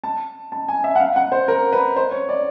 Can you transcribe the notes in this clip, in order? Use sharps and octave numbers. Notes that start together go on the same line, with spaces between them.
A5
A5
G#5
E5
F#5
F5
F#5
C5
A#4
B4
C5
C#5
D5